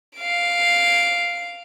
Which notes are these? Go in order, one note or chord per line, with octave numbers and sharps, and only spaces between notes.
F5 D7